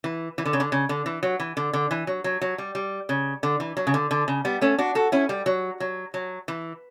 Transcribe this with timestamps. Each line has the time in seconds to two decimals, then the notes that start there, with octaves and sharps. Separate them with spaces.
0.04 E3
0.38 E3
0.45 D3
0.53 C#3
0.60 D3
0.72 C#3
0.89 D3
1.06 E3
1.23 F#3
1.40 E3
1.57 D3
1.73 D3
1.91 E3
2.07 F#3
2.24 F#3
2.41 F#3
2.58 G3
2.75 G3
3.09 C#3
3.43 D3
3.60 E3
3.77 F#3
3.87 C#3
3.94 D3
4.11 D3
4.28 C#3
4.45 G3 B3
4.61 A3 C#4
4.79 D4 F#4
4.95 F#4 A4
5.12 C#4 E4
5.29 G3
5.46 F#3
5.80 F#3
6.14 F#3
6.48 E3